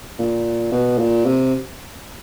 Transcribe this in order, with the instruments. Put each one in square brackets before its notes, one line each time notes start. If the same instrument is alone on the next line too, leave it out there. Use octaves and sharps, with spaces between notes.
[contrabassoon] A#2
B2
A#2
C3